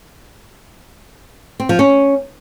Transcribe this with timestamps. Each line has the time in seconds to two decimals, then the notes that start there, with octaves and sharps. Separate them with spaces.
1.60 C4
1.69 F3
1.79 C#4